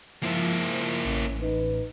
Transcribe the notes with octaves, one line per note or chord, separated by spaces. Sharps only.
G#2 F3 A#3 E4
A1 C#4
D#4 B4